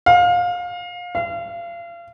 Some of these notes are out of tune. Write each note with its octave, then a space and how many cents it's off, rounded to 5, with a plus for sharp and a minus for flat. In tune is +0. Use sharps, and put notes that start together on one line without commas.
F5 +25
F5 -35